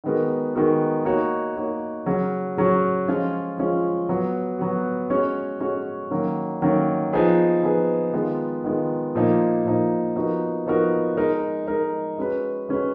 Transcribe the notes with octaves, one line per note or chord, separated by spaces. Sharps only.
D#3 G#3 B3 F#4 A#4
D#3 G#3 B3 F#4 A#4
A#3 D#4 F#4 C#5
A#3 D#4 F#4 C#5
C#3 F#3 C#4 F#4
C#3 F#3 C#4 F#4
F3 G#3 C#4 F4
F3 G#3 C#4 F4
F#3 B3 F#4
F#3 B3 F#4
G#3 C#4 F#4 C#5
G#3 C#4 F#4 C#5
D#3 F#3 A#3 C#4
D#3 F#3 A#3 C#4
F3 B3 D#4 G#4 B4
F3 B3 D#4 G#4 B4
D#3 G#3 B3 F4
D#3 G#3 B3 F4
A#2 F3 A#3 D#4
A#2 F3 A#3 D#4
F3 B3 D#4 F#4 A#4
F3 B3 D#4 F#4 A#4
G#3 D#4 A#4
G#3 D#4 A#4
G#3 C#4 F#4 B4
G#3 C#4 F#4 B4